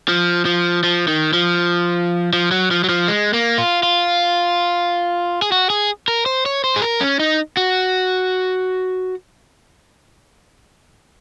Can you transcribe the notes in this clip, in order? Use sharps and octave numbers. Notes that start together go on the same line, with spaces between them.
F3
F3
F3
D#3
F3
F3
F#3
F3
F#3
F3
G#3
A#3
F4
F4
G#4
F#4
G#4
A#4
C5
C#5
C5
G#4
A#4
C#4
D#4
F#4